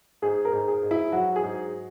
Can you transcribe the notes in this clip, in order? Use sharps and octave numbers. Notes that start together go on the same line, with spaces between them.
G#2 G#4
A#4
G#2
G#4
G#2
E4
F#3 F#4
G#4
G#2